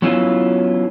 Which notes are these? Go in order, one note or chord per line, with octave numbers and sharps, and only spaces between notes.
F#3 B3 C#4 E4 F4